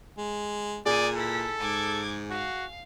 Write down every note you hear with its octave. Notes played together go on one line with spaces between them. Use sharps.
G#3
A#2 G#4 D5 D#6 G#6
E4 A4 B6
G#2 D6 G#6
F#4 F5